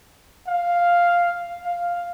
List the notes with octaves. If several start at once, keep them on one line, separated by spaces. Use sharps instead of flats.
F5
F5